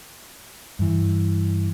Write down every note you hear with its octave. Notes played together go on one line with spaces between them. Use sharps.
G2 E3